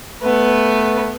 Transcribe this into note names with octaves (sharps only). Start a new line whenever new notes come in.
A3 B3 B4